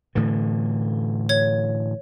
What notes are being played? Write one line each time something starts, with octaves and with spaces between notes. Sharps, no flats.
A2 D3 E3
C#5 G#6